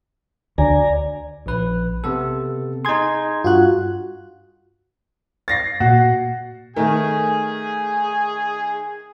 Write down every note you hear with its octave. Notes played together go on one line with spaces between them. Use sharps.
D2 D5 G#5 A#5
A#1 B4
C3 B3 A4
D#4 G#4 C6 G#6
G2 F4 F#4 F#6
A6 A#6 C7
A#2 F#4
D#3 A3 G#4 A#4 G#5